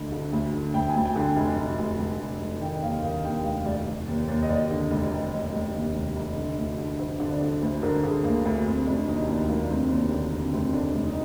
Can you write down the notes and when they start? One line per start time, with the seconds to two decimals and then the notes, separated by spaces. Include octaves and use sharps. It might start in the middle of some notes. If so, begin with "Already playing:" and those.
Already playing: D2 D3 D#5
0.12 D3
0.32 D2
0.53 D3
0.74 D2 G5
0.89 G#5
0.96 D2
1.05 G5
1.16 D3
1.21 G#5
1.36 F1
1.57 F1
1.79 F1
1.98 F1
2.20 F1
2.41 F1
2.61 D#3 G5
2.82 D#2 F5
3.03 D#3 F5
3.24 D#2 G5
3.44 F1 F5
3.65 F1 D5
3.87 F1
4.08 D#2
4.28 D#2
4.42 D#5
4.48 D#2 D5
4.70 D3
4.91 F1
5.11 F1
5.32 F1
5.52 F1
5.74 D#2
5.95 F1
6.15 F1
6.36 D3
6.57 D2
6.78 D3
6.98 D3 C5
7.20 D3
7.31 D5
7.41 D3
7.61 D2 C5
7.82 D3 A#4
8.04 D3 G#4
8.23 D2 A#3
8.45 D2
8.66 D2 C4
8.86 F1 D4
9.08 D#2 D#4
9.27 D#2 D4
9.48 F1 A#3
9.63 D4
9.69 F1 C4
9.90 D#2 D4
10.11 D3 D4
10.33 D3 C4
10.53 F1 C4
10.73 D3 D4
10.94 F1
11.05 D#4